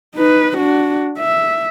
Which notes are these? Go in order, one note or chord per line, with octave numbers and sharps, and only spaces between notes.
D#4 B4
D4 F#4
E5